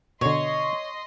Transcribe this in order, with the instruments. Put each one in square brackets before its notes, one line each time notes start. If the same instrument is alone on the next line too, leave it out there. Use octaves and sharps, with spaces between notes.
[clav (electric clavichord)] B2 D3 [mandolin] C#5 [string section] D#5 C6